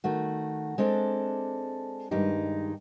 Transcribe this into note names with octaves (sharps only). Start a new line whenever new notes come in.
D#3 A3 F#4
G#3 C4 D4 A4 D5
G2 D#3 G#3 D#4 G4